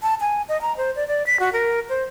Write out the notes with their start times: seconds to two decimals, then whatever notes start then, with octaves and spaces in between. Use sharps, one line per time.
0.02 A5
0.21 G#5
0.49 D#5
0.62 A#5
0.77 C5
0.96 D5
1.08 D5
1.26 B6
1.40 F#4
1.53 A#4
1.89 C5